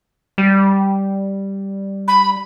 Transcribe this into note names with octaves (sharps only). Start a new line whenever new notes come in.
G3
B5